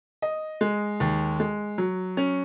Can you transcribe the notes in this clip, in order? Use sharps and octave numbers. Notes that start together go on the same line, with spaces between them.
D#5
G#3
D#2
G#3
F#3
C#4